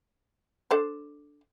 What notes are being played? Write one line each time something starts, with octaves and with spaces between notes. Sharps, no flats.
D4 A4 C5